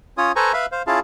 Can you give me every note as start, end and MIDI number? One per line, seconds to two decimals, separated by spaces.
0.18 0.32 61
0.18 0.32 65
0.18 0.32 73
0.18 0.32 87
0.36 0.52 69
0.36 0.52 71
0.36 0.52 72
0.36 0.52 80
0.36 0.52 82
0.36 0.52 85
0.53 0.66 71
0.53 0.66 76
0.53 0.66 77
0.53 0.66 83
0.72 0.82 72
0.72 0.82 77
0.87 0.99 61
0.87 0.99 64
0.87 0.99 65
0.87 0.99 68
0.87 0.99 77
0.87 0.99 81